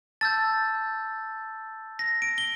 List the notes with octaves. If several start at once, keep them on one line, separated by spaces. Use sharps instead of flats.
A5 E6 G6 A6
A#6
D7
G7